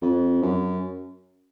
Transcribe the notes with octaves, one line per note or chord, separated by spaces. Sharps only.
F2
F#2